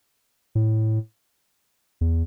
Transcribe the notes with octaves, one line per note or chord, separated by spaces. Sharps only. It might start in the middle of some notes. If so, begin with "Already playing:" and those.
A2
E2